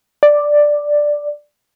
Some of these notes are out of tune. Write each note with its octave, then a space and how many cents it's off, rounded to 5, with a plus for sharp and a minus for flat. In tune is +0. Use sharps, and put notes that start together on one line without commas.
D5 +5